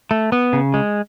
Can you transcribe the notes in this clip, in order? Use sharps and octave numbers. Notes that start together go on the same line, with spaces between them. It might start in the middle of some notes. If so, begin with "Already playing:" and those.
A3
B3
C#3
G#3